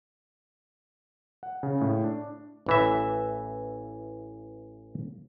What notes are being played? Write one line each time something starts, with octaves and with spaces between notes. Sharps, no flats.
F#5
C#3
A2
D4
A1 E3 E5